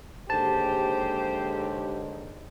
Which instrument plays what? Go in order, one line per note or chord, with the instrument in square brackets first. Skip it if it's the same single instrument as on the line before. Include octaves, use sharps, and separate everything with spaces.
[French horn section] D#2 G#2 D3 [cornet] G4 [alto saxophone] C5 [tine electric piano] A5